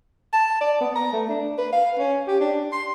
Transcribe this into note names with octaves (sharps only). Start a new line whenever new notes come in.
A5
D5
B3
A#5
A3
D4
B4
F5
C#4
G4
D4
C6